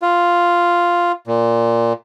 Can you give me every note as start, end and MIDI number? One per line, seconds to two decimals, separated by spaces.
0.02 1.12 65
1.27 1.93 46